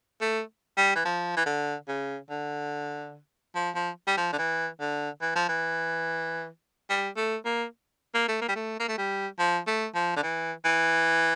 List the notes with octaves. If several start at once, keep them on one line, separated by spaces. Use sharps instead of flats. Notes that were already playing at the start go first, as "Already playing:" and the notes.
A3
G3
E3
F3
E3
D3
C#3
D3
F3
F3
G3
F3
D3
E3
D3
E3
F3
E3
G3
A3
A#3
A#3
A3
A#3
G3
A3
A#3
A3
G3
F3
A3
F3
D3
E3
E3